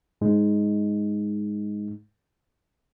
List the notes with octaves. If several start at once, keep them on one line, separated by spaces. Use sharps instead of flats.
G#2 G#3 D#4